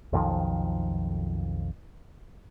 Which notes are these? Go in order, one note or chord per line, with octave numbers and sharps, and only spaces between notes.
B1 F2 D#3 F3